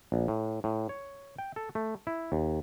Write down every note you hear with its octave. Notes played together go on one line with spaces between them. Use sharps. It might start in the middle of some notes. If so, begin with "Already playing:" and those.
A#1
A2
A2
C#5
G5
A4
A3
E4
D#2